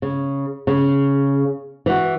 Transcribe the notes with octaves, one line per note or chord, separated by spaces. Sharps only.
C#3
C#3
E3 F#4